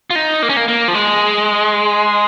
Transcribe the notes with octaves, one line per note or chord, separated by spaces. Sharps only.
F4
D#4
A#3
C#4
A#3
A#3
F3
G#3